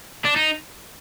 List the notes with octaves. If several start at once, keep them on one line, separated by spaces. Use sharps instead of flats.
D4
D#4